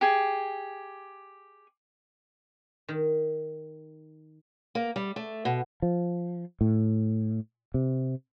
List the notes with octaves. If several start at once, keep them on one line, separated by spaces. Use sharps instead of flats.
G4 G#4
D#3
A#3
G3
A3
B2
F3
A2
C3